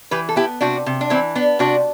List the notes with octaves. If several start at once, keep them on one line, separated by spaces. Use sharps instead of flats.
E3 G4 B4
A4
B3 E4 G4
C3 D4 F#4
C3
D4
E3 C4 E4
B3 D4
C3 D4 F#4